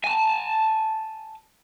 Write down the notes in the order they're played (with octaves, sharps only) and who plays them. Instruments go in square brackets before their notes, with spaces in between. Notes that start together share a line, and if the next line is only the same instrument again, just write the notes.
[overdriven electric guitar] G#5 A5